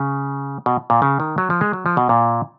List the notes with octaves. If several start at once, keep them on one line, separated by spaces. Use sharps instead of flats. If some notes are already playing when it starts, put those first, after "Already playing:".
Already playing: C#3
B2
A#2
C#3
D#3
F#3
F3
G#3
F#3
F3
B2
A#2